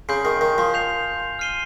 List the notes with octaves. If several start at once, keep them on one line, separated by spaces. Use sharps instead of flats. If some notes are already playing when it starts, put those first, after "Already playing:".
C#3 G#5 C6 G6 C7
D#3
D#3
F3
G6 C7 F7
F6 C7 D#7 G7